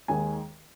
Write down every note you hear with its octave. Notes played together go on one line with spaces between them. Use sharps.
D#2 D#3 G#3 G#5